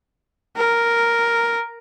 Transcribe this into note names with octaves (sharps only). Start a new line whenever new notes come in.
A#4